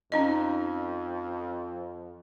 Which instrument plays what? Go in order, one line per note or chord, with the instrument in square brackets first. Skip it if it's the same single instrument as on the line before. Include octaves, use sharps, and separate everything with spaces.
[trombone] F2 [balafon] C#4 D#4 D#5